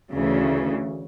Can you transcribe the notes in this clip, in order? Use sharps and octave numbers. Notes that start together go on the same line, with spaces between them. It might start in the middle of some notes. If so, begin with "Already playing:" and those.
D2 C#3 E3